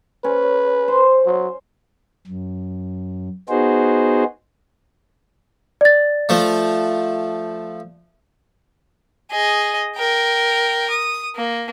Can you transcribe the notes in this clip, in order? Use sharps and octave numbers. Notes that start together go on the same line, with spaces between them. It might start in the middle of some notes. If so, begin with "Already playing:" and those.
C#4 B4
C5
F#3
F#2
B3 D#4 F#4 G#4 C5
D5 A6
F3 A3
G#4 D#5
A#4 G5
D#6
A#3